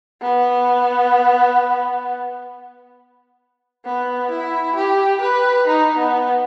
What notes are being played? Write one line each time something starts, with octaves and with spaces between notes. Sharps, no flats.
B3
B3
E4
G4
B4
D#4
B3